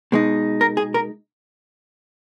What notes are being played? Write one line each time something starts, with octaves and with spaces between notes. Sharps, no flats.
B2 G#3 D#4
A#4
G#4
A#4